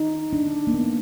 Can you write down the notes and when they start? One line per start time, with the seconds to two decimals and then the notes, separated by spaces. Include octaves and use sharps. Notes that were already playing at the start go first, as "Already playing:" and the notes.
Already playing: D#4
0.33 D4
0.67 A#3
0.74 B3